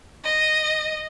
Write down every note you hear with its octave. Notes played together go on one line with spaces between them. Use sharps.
D#5